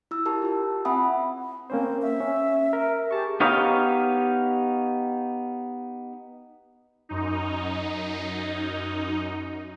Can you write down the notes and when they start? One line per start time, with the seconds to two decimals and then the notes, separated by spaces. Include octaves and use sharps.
0.11 E4 E6
0.25 E4 G4 A#4 A5
0.42 F4 G4
0.85 C4 E5 F#5 G#5 B5 D#6
1.70 A#3 C4 C#4 C5
2.02 E5
2.20 C#4
2.73 A#4
3.11 G4 G#4 A5 C#6
3.40 B3 D#4 G4 C#5 F5
7.09 F#2 D#4